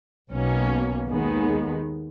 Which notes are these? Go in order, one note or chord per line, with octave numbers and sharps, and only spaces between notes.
B1 B2 A#3 C#4
D#2 D#3 G#3 B3